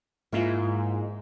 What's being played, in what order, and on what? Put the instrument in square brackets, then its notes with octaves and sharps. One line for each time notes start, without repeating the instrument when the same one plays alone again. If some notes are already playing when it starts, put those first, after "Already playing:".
[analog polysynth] G#2 [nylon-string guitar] A#3 E4 F4